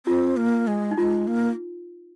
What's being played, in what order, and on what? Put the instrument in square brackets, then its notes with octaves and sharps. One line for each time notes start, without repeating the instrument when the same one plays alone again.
[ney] C4 [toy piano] F4
[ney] A#3
G#3
[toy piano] D#4
[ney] G#3 [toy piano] F4
[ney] A#3